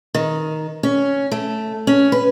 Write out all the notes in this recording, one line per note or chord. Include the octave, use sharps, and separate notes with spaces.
D#3
C#4
A3
C#4
B4